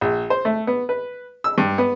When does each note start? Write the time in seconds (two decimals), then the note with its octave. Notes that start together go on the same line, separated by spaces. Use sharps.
0.01 A#1
0.30 C5
0.45 A3
0.67 B3
0.89 B4
1.44 E6
1.58 G2
1.78 B3